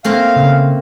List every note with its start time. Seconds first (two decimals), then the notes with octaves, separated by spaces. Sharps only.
0.04 A3 A#3 C4 F5
0.36 C#3